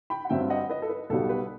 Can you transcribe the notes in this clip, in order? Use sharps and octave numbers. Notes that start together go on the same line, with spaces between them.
G5 B5
F#5
G2 F#3 C4 E5 G5
D#5 F#5
B4 D#5
A4
B4
B1 B2 G3 A4
B4